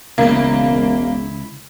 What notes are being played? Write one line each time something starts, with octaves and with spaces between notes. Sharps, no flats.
E1 C#2 C#3 A#3 E4